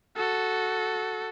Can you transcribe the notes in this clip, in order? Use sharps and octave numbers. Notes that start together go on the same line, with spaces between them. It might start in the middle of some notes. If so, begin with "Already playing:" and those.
F#4 A4